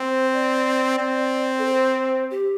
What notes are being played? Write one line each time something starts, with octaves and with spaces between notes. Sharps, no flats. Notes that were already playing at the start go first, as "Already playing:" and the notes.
Already playing: C4 C5
D5
C4
A4
C5
G4